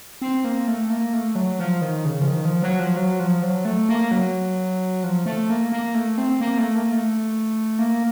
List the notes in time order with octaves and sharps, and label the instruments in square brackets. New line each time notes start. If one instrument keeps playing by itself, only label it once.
[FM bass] C4
A#3
A3
A#3
A3
F#3
F3
D#3
C#3
F3
D#3
F3
F#3
F3
F#3
F3
F#3
A3
A#3
F#3
F3
A3
A#3
A#3
A3
C4
A#3
A3
A#3
A3
A#3